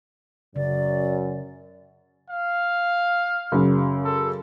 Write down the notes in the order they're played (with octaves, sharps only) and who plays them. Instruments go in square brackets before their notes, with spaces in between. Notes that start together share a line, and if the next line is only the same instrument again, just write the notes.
[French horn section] F#2 [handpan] C#3 [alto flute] D5
[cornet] F5
[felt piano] F#2 C#3
[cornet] A4